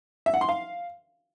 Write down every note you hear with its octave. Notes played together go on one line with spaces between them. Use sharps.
E5
F#5
C6
F5